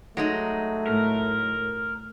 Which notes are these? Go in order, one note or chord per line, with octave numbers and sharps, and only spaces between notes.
F#3 G#3 A3 D#4
A2 A#4